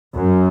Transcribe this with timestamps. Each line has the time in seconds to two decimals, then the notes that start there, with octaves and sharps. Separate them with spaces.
0.17 F#2